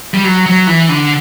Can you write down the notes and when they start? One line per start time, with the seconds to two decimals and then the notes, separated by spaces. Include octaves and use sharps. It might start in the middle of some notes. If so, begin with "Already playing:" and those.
0.14 G3
0.24 F#3
0.46 F#3
0.67 E3
0.89 D3